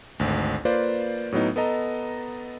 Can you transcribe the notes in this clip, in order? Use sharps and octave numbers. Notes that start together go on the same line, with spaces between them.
G#1 D2
A#3 F4 B4 C5 D5
A2 F#3 B3 D#4
B3 A4 D#5 A#5